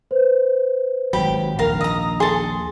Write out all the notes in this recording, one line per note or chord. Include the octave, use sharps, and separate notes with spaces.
B4 C5
G#1 C#2 F#3 G4 G5 B5
A#1 D#2 A#4 F5
D#5 A#5 D#6 E6 A#6
G#4 A4 C6